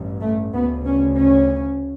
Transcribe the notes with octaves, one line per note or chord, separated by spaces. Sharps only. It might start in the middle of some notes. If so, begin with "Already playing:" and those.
Already playing: A1 G2
A3
D2 C#3 B3
C#4
C#4